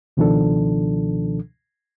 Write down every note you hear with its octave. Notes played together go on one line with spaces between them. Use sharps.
C#2 B2 D#3 F3 D4 A4